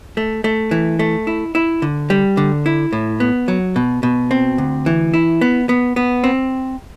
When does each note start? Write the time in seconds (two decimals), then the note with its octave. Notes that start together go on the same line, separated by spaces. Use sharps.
0.17 A3
0.44 A3
0.71 E3
0.99 A3
1.27 E4
1.55 E4
1.82 D3
2.10 G3
2.37 D3
2.66 E4
2.93 A2
3.20 B3
3.48 F#3
3.76 B2
4.03 B2
4.31 C4
4.58 D2
4.86 E3
5.14 E4
5.41 B3
5.69 B3
5.96 B3
6.24 C4